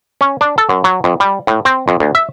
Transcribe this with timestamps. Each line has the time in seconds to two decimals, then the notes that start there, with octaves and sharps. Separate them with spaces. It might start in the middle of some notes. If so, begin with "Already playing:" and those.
0.21 C#4
0.41 D4
0.58 A4
0.69 F#2
0.84 F#3
1.04 F2
1.20 G3
1.47 A2
1.65 C4
1.88 F2
2.00 D2
2.15 E5